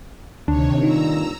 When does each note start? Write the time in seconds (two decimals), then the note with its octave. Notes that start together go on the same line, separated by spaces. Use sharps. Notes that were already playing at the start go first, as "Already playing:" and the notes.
0.48 D2 C3 D#3 D4 C#5
0.83 G2 A#2 D#3 D#4 A#5 E6